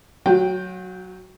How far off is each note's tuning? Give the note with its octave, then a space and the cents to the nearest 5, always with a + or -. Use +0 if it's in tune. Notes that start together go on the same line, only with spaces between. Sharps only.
F#3 +0 F#4 -40 G5 +0